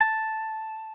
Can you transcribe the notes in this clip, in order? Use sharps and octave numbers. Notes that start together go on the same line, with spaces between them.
A5